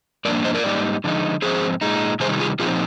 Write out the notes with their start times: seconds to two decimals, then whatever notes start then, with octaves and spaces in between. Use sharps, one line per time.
0.25 G2 F3 A#3 D4 A#4 D5
0.45 C5 D#5
0.54 A#4 D5
0.64 G#2 G3 A#3 D#4
1.04 D3 F3 G#3 D#4
1.42 G#2 F3 C4 G#4 C5
1.81 A#2 G#3 D#4
2.20 C3 D#3 G3 G#4 C5
2.40 F4 G#4
2.59 A#2 F3 C4 D#4 F4 G#4